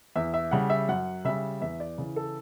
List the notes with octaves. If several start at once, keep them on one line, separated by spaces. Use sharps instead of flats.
E2 E5
E5
C#3 G3 F#5
E5
F#2 F#5
C#3 G3 E5
E2 E5
D5
C#3 E3
A4